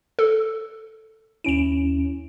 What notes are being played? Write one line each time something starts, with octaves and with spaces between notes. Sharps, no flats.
A4
D#2 C#4 E4 D7 E7